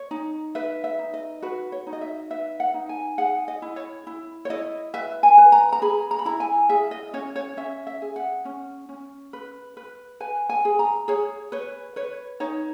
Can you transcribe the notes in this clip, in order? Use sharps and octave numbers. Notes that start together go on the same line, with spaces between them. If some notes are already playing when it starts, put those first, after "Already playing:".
Already playing: C#5
D#4
B4 E5
E5
D#4
D#5
F#4 B4
C#5
D#4
D#5
E5
B4 E5
F#5
D#4
G#5
G#4 F#5
D#5
E4
C#5
E4
C#5
E4 D#5
B4 E5
G#5
B4
A#5
A#5
G#4 B5
A#5
B5
E4 A#5
G#5
G#4 E5
D#5
C#4 C#5
C#5
C#4 E5
E5
G#4
F#5
C#4
C#4
B4
B4
B4 G#5
G#5
G#4
A#5
G#4 C#5
B4 C#5
B4 C#5
D#4 C#5